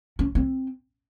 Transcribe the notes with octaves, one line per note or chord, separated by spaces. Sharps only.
C#4
C4